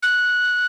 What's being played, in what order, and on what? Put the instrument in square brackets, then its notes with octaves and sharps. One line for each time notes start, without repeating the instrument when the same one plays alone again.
[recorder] F#6